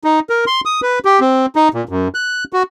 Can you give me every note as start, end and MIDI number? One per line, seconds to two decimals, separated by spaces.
0.04 0.20 63
0.30 0.45 70
0.47 0.61 84
0.65 0.81 87
0.82 0.99 71
1.05 1.20 67
1.20 1.46 60
1.56 1.69 63
1.74 1.84 46
1.89 2.08 42
2.14 2.44 90
2.53 2.63 66